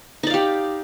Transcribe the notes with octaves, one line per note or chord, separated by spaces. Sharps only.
D#4 G4 D5 F5